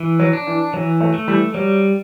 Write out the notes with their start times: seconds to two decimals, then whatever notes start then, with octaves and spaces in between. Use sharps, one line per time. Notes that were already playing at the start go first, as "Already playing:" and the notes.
Already playing: E3
0.20 F#3
0.33 D4
0.47 E3
0.73 E3 F#3
1.00 F#3 A3
1.14 A3
1.27 E3 G3
1.54 F#3 G3